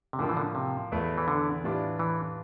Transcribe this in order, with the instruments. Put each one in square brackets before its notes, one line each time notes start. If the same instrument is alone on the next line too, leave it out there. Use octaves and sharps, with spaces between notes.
[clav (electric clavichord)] C3
[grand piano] A2 F3 A#3 D4 F4 [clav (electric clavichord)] D3
[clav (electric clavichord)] E3
D3
C3
[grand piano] E2 E3 A3
[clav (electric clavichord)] E3
D3
[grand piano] A2 E3 G3 D4 F4
[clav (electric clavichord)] E3